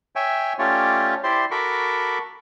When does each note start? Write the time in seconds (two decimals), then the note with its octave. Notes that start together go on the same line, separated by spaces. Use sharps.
0.16 C#5 E5 G5 G#5
0.59 A3 C#4 F4 G4 C#5 D5
1.23 E4 G4 C5 D5 C6
1.51 F#4 A4 A#4 B5 C#6 D6